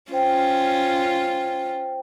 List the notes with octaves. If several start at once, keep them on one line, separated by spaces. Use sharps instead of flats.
C#4 F4 C5 G5